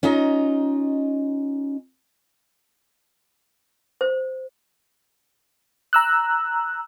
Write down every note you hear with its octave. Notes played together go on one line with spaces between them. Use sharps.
C#4 D#4 F4 D#5 A#5
C5
A#5 E6 F#6